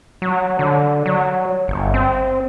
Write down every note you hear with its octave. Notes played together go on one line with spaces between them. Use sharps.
F#3
D3
F#3
G1
C4